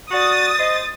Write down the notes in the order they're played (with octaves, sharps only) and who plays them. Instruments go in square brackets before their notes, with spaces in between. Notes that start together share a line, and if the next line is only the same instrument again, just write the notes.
[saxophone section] F#4 D5 [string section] D#6 A6
[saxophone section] C5 D#5